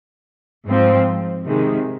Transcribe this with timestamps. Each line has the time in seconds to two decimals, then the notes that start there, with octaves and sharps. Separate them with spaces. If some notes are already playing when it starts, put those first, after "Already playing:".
0.67 G#2 F3 C4
1.46 C3 D#3 G#3